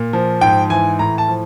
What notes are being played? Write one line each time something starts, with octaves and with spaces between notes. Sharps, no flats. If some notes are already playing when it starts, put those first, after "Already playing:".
Already playing: A#2
F3
G#2 G5
E3 G#5
A2 A#5
A5
F3